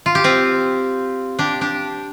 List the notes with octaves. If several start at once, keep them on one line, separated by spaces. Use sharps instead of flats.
F4
G4
C4 F4
D4 G4
D4 G4